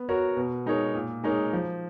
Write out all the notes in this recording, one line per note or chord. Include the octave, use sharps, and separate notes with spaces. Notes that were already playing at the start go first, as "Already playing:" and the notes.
Already playing: B3
F#4 A#4 C#5
B2
G#3 D#4 A#4 C#5
A#2
G#3 D#4 A#4 C#5
F3